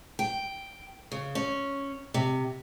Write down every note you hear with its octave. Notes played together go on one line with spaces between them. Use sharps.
G5
C#3
C#4
C3